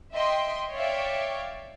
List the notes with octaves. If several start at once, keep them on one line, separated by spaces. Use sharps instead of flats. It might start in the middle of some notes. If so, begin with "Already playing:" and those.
D#5 E5 G5 C6
C#5 D5 E5 F5 G5